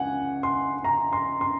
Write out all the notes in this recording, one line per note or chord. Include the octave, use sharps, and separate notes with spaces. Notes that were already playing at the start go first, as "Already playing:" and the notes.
Already playing: C#2 F#5 G#5
C6
A#5
C6
C6